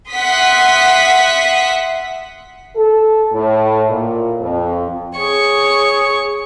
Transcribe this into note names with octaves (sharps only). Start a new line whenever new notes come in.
E5 F#5 C6 D#6 B6
A4
A2
A#2
F2
G#4 C#5 C#6